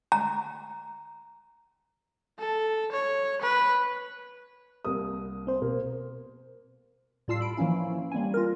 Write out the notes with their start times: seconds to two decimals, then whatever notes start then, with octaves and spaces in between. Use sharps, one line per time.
0.12 A#5
2.39 A4
2.92 C#5
3.42 B4
4.85 C2 A#3 D#6
5.47 C4 C5
5.62 B2 A#3
7.28 A2 G3 F4 A5 E6 C7
7.41 B5 D7
7.57 E3 F3 A#3 C#4 E4
8.12 G3 A#3 C4 G#5
8.34 F4 A#4